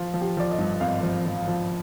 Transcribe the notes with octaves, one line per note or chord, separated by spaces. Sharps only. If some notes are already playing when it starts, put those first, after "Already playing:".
Already playing: F3 F4
F3
G4
F3 D5
D#5
G2
G#1 F5
F3
F3
F3